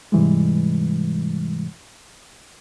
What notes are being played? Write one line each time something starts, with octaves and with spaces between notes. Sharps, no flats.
G#2 C3 E3 G3 G#3